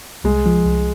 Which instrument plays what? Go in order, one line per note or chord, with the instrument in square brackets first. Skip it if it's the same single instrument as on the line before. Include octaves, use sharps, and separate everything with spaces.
[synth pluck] C2 [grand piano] G#3
[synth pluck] F3
C2